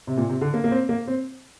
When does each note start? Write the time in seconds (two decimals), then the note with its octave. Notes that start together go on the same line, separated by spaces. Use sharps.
0.07 C3
0.17 A#2
0.29 C3
0.41 D3
0.54 A#3
0.64 A#3
0.71 C4
0.89 A#3
1.07 C4